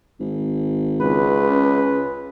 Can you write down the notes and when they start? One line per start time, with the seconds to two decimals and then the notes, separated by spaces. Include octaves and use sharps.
0.20 G#1
1.01 C#2 B4
1.50 C#3